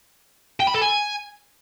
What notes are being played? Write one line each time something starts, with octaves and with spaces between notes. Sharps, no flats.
G5
B5
A4
G#5